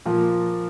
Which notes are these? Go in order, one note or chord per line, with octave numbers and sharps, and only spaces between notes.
A#2 F3 A#3